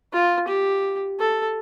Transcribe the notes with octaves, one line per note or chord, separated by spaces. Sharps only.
F4
G4
A4